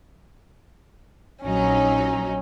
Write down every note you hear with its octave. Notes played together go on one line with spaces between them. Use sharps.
A#1 F#3 C#4 D#4